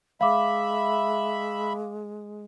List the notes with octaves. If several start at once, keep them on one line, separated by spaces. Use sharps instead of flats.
G#3 E5 F5 B5 D6